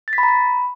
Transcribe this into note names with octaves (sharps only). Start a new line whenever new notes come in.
A6
B6
B5
A#5
B5